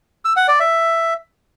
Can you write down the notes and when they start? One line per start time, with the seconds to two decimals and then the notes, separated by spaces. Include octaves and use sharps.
0.25 E6
0.37 F#5
0.48 D5
0.60 E5